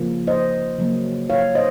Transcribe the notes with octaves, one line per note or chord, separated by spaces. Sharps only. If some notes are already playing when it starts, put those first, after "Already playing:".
Already playing: C#3 F3 A#3
C5 D#5
C#3 F#3 A#3
C#5 F5
C5 D#5